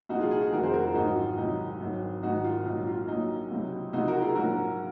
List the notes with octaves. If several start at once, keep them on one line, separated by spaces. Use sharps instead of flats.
C2 A#2 F3 D#4 F#4
F4 G#4
F4 G#4
D#4 F#4
F1 F2 D#3 F#4 A#4
G#4 C5
F#4 A#4
F4 G#4
G#1 G#2 F#3 D#4 F#4
F4
C2 C3 D#3 F#3 D#4
G#1 G#2 F#3
G#1 G#2 D#3 D#4 F#4
F4
A#1 A#2 F#3 D#4
F4
A#1 A#2 F#3 D#4
C#2 C3 F#3
C#2 C3 F3 D#4 F#4
F#4 A#4
F4 G#4
A#1 G#2 F#3 F#4 A#4